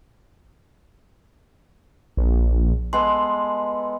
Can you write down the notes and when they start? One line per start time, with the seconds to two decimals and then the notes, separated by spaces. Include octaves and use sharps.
2.17 A#1
2.93 G#3 B3 A4 C6